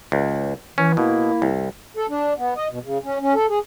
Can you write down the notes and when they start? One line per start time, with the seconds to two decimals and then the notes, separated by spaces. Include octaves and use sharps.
0.12 C#2
0.78 E3 C#4
0.97 B2 A#3 E4
1.42 C2
1.97 A4
2.09 D4
2.38 B3
2.57 D#5
2.70 B2
2.84 C#3
3.04 C#4
3.21 C#4
3.35 A4
3.50 G#4